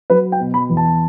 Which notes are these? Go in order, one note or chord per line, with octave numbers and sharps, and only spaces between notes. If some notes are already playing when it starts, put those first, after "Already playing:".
F#3 B4
G5
B2
B5
E2
A5